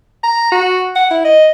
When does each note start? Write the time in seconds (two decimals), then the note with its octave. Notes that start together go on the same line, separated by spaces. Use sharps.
0.24 A#5
0.52 F#4
0.96 F#5
1.11 E4
1.25 D#5